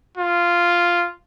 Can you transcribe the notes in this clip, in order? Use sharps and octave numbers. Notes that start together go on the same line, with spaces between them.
F4